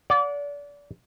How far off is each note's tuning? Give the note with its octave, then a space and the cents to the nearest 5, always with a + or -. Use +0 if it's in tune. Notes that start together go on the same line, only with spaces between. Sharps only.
D5 -30 F#5 -30